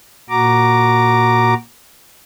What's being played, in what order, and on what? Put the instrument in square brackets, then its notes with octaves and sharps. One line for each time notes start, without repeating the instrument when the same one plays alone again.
[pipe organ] A#2 F#4 A#5 D6